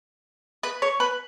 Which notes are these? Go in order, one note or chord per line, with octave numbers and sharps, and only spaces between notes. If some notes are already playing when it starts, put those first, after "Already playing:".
B4
C#5
B4